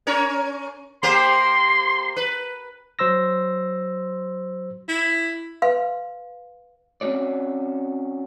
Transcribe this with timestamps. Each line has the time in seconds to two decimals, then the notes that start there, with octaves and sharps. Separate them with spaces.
0.07 C#4 A#4 C#5
1.03 A#3 G4 C5 C6
2.16 B4
2.99 F#3 C5 C6 E6 A#6
4.88 E4
5.62 B4 F5 C6
7.01 C4 C#4 F#4 C#5 D5